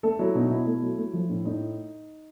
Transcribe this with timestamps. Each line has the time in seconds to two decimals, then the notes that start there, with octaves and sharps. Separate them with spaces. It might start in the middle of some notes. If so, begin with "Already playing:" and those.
0.03 A3 A4
0.19 F#3 E4
0.35 B2 D#4
0.51 B2 E4
0.67 A3
0.82 F#3
0.98 A3
1.14 F3
1.30 A2
1.45 A2 D#4